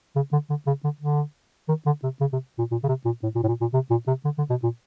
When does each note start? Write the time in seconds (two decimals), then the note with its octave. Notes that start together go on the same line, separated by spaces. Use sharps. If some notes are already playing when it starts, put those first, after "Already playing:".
0.16 C#3
0.32 D3
0.50 D3
0.67 C#3
0.84 D3
1.01 D3
1.69 D#3
1.86 D3
2.03 C3
2.21 C#3
2.33 C3
2.58 A#2
2.71 A#2
2.84 C#3
2.88 C3
3.05 A#2
3.23 A2
3.35 A#2
3.43 A2
3.48 A#2
3.61 A#2
3.74 C3
3.90 A#2
4.07 C3
4.25 D3
4.38 D3
4.50 B2
4.63 A#2